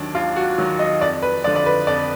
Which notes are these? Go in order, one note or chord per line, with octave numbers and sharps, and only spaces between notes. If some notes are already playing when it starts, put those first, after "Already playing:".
Already playing: D#2 D#3 F#3 D4
D#2 F4
F#4
D#3 F#3
D#5
F2 D5
B4
D3 F3 D5
D5
B4
F2 D5